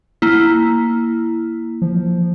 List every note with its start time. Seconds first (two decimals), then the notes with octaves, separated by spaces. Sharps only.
0.22 A#3 E4
1.82 F3